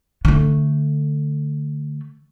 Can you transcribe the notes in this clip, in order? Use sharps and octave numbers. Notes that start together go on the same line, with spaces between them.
D3 A3